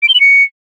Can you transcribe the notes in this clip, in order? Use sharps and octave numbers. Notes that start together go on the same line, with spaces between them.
D7
G7
F#7
C#7